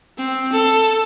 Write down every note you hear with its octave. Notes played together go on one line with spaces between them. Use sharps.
C4
A4